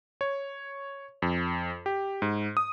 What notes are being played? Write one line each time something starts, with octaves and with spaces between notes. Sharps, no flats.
C#5
F2
G4
G#2
D#6